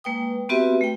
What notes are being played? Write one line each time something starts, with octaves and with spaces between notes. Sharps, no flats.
G#3 A#3 B4 G5 D#6
B3 C4 F#4 G4 B4 E5
A3 G5